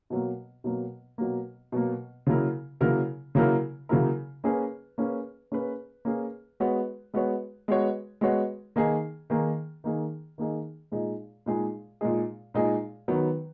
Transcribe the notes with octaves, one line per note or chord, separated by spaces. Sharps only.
B2 F#3 A#3
B2 F#3 A#3
B2 F#3 A#3
B2 F#3 A#3
C#3 F#3 A#3 E4 A#4
C#3 F#3 A#3 E4 A#4
C#3 F#3 A#3 E4 A#4
C#3 F#3 A#3 E4 A#4
A#3 C#4 G#4 B4
A#3 C#4 G#4 B4
A#3 C#4 G#4 B4
A#3 C#4 G#4 B4
G#3 B3 F#4 C#5
G#3 B3 F#4 C#5
G#3 B3 F#4 C#5
G#3 B3 F#4 C#5
D#3 A#3 D#4 G#4
D#3 A#3 D#4 G#4
D#3 A#3 D#4 G#4
D#3 A#3 D#4 G#4
A#2 G#3 D#4 G#4
A#2 G#3 D#4 G#4
A#2 G#3 D#4 G#4
A#2 G#3 D#4 G#4
D#3 F#3 B3